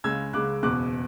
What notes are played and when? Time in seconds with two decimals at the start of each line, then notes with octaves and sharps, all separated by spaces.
0.04 C#2 C#3 G#3 E6 G#6
0.33 C#2 C#3 G#3 D6 F#6
0.63 F#1 E2 B2 D6 F#6